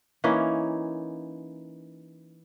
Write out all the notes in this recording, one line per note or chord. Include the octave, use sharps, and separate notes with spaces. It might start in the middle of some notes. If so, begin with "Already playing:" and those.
E3 A#3 C#4 D#4